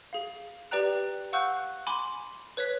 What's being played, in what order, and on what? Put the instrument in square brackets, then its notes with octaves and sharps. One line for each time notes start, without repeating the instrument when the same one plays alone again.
[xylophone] G#4 F5
G4 B4 D5 G5 A#5 F#6
F5 F#5 C#6 E6 F#6 G6
G#5 B5 C6 D6
B4 C#5 F#6 B6